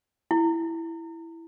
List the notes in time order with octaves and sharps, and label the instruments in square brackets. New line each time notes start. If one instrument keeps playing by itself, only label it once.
[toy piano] E4